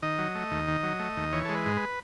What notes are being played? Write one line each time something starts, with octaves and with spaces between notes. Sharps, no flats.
D#3 D#5
F#3
A3
D#2
D#3
F#3
A3
D#2
E3 C#5
G#3 A4
B4
G#2
B4